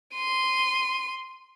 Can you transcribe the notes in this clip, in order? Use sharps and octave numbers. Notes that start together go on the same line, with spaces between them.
C6 D#7